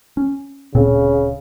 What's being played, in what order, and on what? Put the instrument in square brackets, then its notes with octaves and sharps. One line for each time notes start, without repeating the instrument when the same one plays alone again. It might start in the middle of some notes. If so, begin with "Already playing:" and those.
[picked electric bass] C#4
[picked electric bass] D1 A#2 C4 [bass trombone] C#3